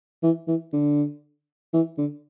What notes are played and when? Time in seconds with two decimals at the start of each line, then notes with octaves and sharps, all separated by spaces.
0.23 E3
0.47 E3
0.73 D3
1.73 E3
1.98 D3